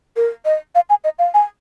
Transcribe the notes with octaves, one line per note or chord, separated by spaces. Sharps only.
A#4
D#5
F5
G#5
D#5
F5
G#5